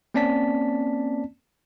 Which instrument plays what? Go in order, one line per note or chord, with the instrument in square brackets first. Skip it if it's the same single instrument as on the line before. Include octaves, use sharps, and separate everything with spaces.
[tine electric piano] A#3 C4 C#4 D5 A5 B6